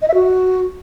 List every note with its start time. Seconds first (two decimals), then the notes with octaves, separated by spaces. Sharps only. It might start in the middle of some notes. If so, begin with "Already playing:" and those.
0.02 D#5
0.08 E5
0.14 F#4